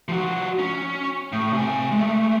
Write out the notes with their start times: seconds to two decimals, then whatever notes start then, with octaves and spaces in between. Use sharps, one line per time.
0.08 F3 F#4
0.59 C#4
1.32 A2
1.53 C3 G#5
1.91 G#3 A3